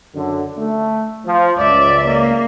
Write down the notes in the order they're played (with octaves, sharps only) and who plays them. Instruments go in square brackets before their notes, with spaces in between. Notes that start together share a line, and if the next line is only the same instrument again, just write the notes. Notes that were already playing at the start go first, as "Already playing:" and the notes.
[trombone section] F#2 D3
A3
F3
[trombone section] C#2 [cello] D5 E5
[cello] A#3